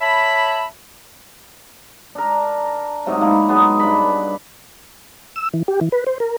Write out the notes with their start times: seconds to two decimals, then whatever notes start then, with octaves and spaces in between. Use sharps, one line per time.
0.01 C#5 E5 A5 B5
2.15 D4 A#4
3.06 G#2 C3 F#3 A3
3.21 A#3 E4
3.48 F#3 G#3 B3 D#4
3.80 G2 D4 B5
5.36 E6
5.54 E3
5.68 G4
5.81 E3
5.92 B4
6.07 C5
6.20 A#4